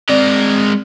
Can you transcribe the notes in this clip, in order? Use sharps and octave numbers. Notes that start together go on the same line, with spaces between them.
G#3 C4 A#4 D5